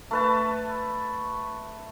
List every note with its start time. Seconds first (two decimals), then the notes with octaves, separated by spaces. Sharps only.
0.11 A3 B4 A5